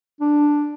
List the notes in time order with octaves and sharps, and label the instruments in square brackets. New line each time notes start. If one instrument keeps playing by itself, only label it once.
[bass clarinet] D4